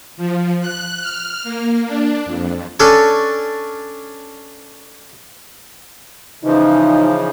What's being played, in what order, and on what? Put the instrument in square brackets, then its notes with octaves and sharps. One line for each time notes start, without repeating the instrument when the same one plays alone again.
[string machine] F3
F#6
F6
A#3
D4
F2
[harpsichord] C#4 D4 A4 C#5
[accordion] C#3 E3 F3 [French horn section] D#4